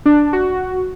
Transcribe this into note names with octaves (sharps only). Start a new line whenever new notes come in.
D4
F#4